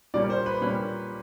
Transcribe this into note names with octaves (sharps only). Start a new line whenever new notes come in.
A#2 G3 A#3 C#4 D5
C5
B4
A#2 G3 A#3 C#4 B4